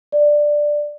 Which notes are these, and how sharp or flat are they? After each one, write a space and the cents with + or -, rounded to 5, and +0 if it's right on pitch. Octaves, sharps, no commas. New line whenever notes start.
D5 +10